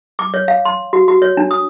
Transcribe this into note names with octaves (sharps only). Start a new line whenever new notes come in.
D6
C#5
F5
C6
F#4
F#4
C#5
D4
D#6